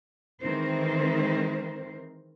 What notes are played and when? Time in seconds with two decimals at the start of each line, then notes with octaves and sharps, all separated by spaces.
0.41 D#3 E3 G#3 C4 A#4 C5